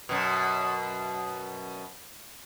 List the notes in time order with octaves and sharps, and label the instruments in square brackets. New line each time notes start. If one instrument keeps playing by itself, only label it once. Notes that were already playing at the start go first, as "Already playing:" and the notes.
[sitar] F#2 B2